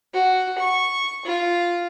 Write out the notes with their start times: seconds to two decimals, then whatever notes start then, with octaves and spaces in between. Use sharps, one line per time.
0.13 F#4
0.59 C#6
1.26 F4